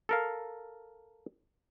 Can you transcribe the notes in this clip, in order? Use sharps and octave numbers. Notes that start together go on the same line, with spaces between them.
A4 A#4 F5